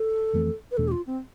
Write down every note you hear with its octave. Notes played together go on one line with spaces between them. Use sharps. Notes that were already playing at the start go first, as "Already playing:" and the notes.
Already playing: A4
F2 E3 A3 C4
B4
E2 B2 A3 D4 A4
G4
F4
C4